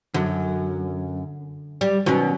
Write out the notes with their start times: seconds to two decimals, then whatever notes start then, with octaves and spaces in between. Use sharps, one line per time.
0.14 F#2 D3
1.81 G3
2.06 B2 D#3 F#3 C#4